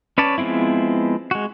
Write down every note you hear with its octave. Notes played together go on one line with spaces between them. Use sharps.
C#4 B4 C#5 D5 A5
F3 G#3 B3 C4 E4
G#3 F#4